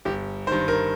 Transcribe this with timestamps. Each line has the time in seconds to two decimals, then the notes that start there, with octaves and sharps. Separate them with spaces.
0.05 G1 G4
0.47 D#3 C5
0.52 G2
0.68 A#4